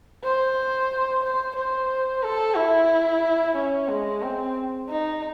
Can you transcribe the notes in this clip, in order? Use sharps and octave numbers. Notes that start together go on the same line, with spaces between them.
C5
C5
C5
A4
E4
C#4
G#3
C4
D#4